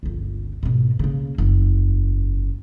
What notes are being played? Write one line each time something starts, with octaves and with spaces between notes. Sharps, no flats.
G1 C#2
G#2 B2
C#3 A#3
F#1 E2